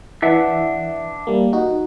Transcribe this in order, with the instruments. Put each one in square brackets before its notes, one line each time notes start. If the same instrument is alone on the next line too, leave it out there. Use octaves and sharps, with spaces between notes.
[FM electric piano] E3 [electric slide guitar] D4 E5 F#5
[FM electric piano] G3 A#3
D#4 F#4